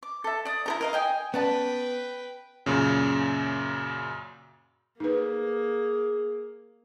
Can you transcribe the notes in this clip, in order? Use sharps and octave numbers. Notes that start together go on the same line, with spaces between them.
D6
A4 E5
D5 D#6
E4 A4 A#5
A#4 D#5 F5
D#5 G5 G#5
B3 C#4 B4 D5 G5 A5
F#2 A#2 C#3
A#3 D#4 G#4 B4